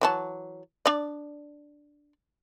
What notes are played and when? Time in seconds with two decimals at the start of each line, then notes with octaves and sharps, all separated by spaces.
0.01 E3 F#3 A5
0.86 D4 D5